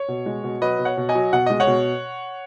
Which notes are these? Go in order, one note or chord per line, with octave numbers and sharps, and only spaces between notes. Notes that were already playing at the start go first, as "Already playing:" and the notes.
Already playing: C#5
B2
G#3
B2
F#3 B4 D#5
B2
C#5 F#5
B2
D#5 G#5
F#3
B2 F#5
G#3 D#5
C#5 F#5
B2